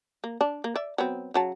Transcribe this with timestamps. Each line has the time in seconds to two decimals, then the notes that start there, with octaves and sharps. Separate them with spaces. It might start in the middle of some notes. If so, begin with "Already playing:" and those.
0.24 A#3
0.41 D4
0.64 A#3
0.76 D5 E5
0.98 F#3 B3 C4
1.34 C#3 F#3 A5